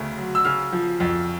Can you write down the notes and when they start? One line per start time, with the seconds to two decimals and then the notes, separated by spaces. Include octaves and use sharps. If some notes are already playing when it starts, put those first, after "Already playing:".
Already playing: D2 C#3 A3
0.17 F#3
0.35 E6
0.45 C#3 F6
0.72 F3
1.00 F2